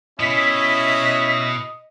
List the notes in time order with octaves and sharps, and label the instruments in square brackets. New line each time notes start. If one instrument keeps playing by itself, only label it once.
[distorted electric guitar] B2 [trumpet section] C#4 E4 [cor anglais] D#5 [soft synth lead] B6